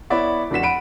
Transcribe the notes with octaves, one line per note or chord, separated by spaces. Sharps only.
B3 E4 C#5 D5 E5
F1 D4 F#4 B6 E7
F#5 B5 D7 D#7